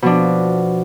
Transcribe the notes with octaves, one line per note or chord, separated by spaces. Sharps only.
B2 F3 D4